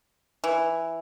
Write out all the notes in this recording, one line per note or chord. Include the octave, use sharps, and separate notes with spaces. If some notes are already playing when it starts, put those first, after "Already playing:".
E3